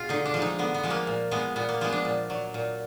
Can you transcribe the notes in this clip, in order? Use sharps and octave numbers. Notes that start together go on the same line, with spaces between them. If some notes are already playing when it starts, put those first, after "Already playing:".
Already playing: B2 F4 G#4
D3 D#4
D4
F3 G#3
D#4
D3 B3
B3
F3 G#3
A#3
A#2
F3 G#3 B3
A#2 B3
A#3
F3 G#3 B3
D4
A#2
F#3
A#2